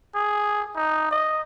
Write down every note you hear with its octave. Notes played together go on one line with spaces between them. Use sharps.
G#4
D#4
D#5